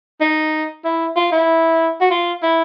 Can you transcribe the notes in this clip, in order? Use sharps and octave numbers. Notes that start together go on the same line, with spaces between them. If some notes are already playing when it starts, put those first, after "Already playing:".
D#4
E4
F4
E4
F#4
F4
E4